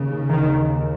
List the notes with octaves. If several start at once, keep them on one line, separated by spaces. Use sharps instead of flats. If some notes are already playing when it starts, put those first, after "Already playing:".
Already playing: D#2 C#3
D#3